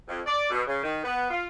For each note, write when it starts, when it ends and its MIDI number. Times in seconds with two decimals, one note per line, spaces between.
0.09 0.19 41
0.26 0.50 74
0.50 0.62 47
0.67 0.80 49
0.82 1.04 51
1.04 1.26 59
1.30 1.46 65